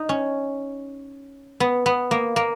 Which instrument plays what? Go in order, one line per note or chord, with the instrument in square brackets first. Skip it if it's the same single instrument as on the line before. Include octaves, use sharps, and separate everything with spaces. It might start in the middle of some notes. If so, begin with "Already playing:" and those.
Already playing: [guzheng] D#4
C#4
B3
B3
A#3
A#3